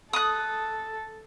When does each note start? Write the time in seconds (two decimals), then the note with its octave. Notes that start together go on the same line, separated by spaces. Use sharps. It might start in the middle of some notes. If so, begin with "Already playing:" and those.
0.13 A4 D#6 F#6